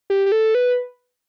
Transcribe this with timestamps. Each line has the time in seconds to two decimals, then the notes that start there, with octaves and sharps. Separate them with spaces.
0.10 G4
0.26 G4
0.32 A4
0.55 B4